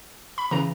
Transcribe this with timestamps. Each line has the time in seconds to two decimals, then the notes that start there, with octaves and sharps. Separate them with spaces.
0.38 B5
0.51 C#3 E3 A#5